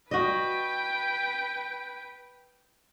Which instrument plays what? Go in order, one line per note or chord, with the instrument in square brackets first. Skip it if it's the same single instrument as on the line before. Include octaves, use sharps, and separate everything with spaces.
[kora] F#4 D#5 [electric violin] B4 G5